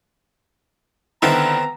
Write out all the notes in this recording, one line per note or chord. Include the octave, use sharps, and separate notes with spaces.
D3 D#3 B3 C4 E4 A4 A#5